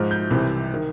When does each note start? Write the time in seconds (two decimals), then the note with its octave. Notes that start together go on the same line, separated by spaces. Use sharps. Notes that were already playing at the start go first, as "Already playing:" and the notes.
Already playing: G#2 F3 F6
0.11 G6
0.30 C2 C3 E3
0.74 D#3